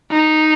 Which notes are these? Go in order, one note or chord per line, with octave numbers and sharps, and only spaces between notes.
D#4